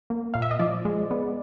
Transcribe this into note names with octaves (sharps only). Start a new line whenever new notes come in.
A#3
A#2 F5
E5
D#5
F3 D5
G#3
B3